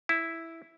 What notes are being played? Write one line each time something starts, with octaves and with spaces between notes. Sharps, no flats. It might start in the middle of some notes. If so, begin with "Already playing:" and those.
E4